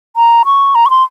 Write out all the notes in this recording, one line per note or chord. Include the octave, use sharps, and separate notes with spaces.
A#5
C#6
A#5
C#6
C6